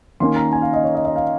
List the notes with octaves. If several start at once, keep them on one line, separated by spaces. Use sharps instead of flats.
D#3 A#3 C#4 C6
A#5
G#5
F5
D#5
C#5
D#5
D#5
F5